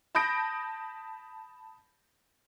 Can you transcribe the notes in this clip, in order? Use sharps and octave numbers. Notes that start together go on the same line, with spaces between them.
A5 B5 D#6 G6 A#6 D7